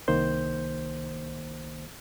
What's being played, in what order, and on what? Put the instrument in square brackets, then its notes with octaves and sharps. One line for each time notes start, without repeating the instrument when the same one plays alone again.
[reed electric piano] C2 D#3 A#3 C5 G6